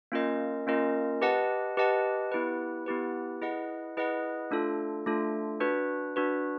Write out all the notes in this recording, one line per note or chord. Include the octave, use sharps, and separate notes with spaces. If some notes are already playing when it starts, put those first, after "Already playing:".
A#3 C#4 F4 A#4 D#5
A#3 C#4 F4 A#4 D#5
G4 B4 D#5 F#5 A5
G4 B4 D#5 F#5 A5
B3 E4 G4 B4
B3 E4 G4 B4
E4 G#4 B4 D#5 F#5
E4 G#4 B4 D#5 F#5
A3 D4 F4 A4
A3 D4 F4 A4
D4 F#4 B4
D4 F#4 B4